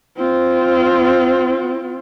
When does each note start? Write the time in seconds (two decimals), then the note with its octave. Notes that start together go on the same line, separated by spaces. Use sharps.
0.17 C4 F4